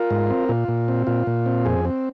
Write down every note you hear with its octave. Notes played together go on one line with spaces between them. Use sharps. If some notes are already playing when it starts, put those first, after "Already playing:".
Already playing: F4 A#4
G#2
C4
A#2 F4
A#2
C4
A#2 F4
A#2
C4
F2 G#4
C4